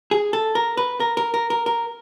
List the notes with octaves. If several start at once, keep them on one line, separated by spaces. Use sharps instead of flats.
G#4
A4
A#4
B4
A#4
A#4
A#4
A#4
A#4